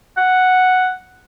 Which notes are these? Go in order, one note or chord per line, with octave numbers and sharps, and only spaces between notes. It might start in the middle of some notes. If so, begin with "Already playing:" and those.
F#5